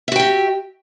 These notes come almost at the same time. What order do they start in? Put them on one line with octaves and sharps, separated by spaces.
E5 F#4 G5 G4